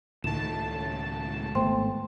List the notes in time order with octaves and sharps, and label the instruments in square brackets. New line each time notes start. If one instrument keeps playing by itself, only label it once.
[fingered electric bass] C#2 D#3 [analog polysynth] A2 A5 [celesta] E7
[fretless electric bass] G#1 A3 B3 [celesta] C5 G5 C6